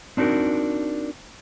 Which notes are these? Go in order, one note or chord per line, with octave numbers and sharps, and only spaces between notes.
C4 D4 D#4 F#4 A#4